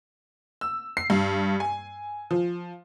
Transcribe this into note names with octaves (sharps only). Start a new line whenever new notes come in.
E6
C7
G2
G#5
F3